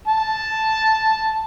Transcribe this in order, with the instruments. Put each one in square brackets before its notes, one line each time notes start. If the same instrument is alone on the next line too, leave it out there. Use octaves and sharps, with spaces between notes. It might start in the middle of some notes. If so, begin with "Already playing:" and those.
[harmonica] A5